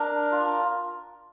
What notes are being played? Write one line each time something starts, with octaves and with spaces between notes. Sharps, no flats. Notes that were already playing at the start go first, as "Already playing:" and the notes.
Already playing: D4 A#4 A#5
F4